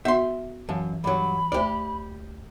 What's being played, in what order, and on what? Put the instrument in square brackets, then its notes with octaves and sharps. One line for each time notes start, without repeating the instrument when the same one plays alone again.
[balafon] B3 F#4 [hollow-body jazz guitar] E5 C6
[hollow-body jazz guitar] F#2 [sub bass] E3 [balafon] F5 A5
[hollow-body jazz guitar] G2 F#3 [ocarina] B5
[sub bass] D2 [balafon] A3 C5 [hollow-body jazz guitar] G4 D5